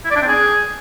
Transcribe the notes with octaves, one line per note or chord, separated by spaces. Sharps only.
E4
D5
D4
C4
G#4